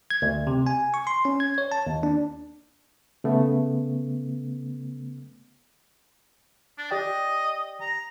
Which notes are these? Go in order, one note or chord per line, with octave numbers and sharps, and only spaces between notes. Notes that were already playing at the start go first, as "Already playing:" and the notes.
G#6
D2
C3
G#5
C#6
C6
C#4
G#6
C#5
A5
D#2
D4
C#3 A3 B3
D4
G4 D5 D#5 G5
A#5